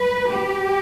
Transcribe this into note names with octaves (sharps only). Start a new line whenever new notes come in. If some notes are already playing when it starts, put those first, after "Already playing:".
Already playing: B4
G4